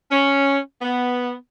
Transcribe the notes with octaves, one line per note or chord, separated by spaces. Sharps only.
C#4
B3